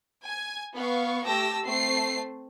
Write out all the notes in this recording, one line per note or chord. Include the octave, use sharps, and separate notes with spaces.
G#5 G#6
B3 F5 C#6
A3 G4 A5 E6 A#6
A3 C4 C7